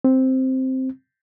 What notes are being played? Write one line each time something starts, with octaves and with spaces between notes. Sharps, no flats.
C4